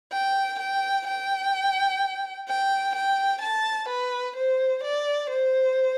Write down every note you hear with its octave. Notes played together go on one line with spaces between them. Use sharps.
G5
G5
G5
G5
G5
A5
B4
C5
D5
C5